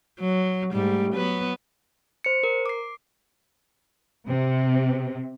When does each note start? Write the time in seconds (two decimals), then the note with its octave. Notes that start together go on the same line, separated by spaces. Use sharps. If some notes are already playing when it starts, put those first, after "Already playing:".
0.20 F#3
0.73 G#2 G3 A3
1.14 F#3 B3 B4
2.24 C5 C#7
2.43 A#4
2.66 D6 C7
4.27 C3